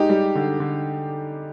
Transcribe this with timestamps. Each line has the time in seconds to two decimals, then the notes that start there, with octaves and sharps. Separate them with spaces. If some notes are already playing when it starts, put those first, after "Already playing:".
Already playing: G#3 D#4 G4
0.09 G3
0.35 D3
0.60 D3